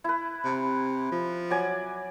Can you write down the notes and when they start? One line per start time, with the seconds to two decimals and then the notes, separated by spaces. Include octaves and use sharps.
0.04 E4 B4
0.44 C3
1.12 F3
1.51 F#3 D5 G#5